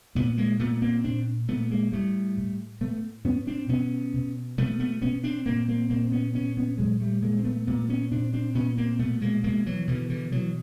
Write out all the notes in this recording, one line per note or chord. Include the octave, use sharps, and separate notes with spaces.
A#2 A3 B3
G#3 A#3
A#2 A3 B3
A#3 C4
A#2 C4 D4
A#2 A3 B3
G#3 A#3
A2 G3 A3
A2
A2 A3 B3
A2 B3 C#4
C4 D4
B2 B3 C#4
B2
B2 A3 B3
A3 B3
B2 B3 C#4
C4 D4
A#2 A#3 C4
A#3 C4
A#2 A#3 C4
C4
B3 C#4
A#2 B3 C#4
B3 C#4
A#2 F#3 G#3
G3 A3
A#2 G#3 A#3
C4
A3 B3
A#2 A3 B3
B3 C#4
A#2 C4 D4
C4 D4
A#2 B3 C#4
A#3 C4
B2 A3 B3
G#3 A#3
B2 G#3 A#3
E3 F#3
B2 D3 E3
D3 E3
B2 E3 F#3